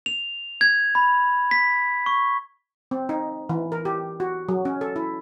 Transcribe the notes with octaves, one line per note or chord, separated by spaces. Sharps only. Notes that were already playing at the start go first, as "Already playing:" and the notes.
F7
G#6
B5
B6
C#6
C4
D#4
E3
A#4
G4
F#4
F#3
C#4
A4
E4